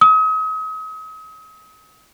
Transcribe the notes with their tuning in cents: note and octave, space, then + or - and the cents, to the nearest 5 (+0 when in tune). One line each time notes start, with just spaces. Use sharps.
D#6 +40